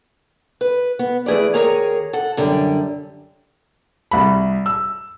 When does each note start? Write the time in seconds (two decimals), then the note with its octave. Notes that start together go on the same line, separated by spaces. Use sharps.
0.61 B4
0.99 B3
1.26 E3 A3 G#4 B4 D5
1.54 D#2 G#4 A#4 C#5 G#5 A#5
2.13 A4 F#5
2.37 F#2 D3 G3
4.11 C2 B5
4.66 E6